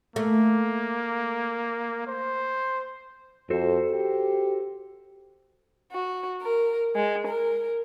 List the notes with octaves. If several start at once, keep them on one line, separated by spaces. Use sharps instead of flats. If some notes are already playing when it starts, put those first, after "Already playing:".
A3 A#3
C5
F2 F#4 A4 C5
G4
F#4
A#4
G#3
A#4